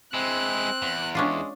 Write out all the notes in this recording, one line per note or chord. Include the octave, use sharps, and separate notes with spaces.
G#3 C4 E4 F#6
E2
G#3 C#4 D4 F4